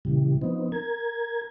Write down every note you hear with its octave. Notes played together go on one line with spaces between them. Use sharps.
A#2 C#3 E3 G3
F3 B3 C4 D#4
A#4 G#6